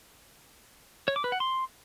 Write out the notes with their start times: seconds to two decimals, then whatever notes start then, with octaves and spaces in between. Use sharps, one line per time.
1.08 C#5
1.16 D6
1.24 B4
1.32 F#5
1.40 C6